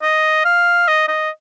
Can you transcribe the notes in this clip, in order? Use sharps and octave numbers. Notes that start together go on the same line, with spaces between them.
D#5
F5
D#5
D#5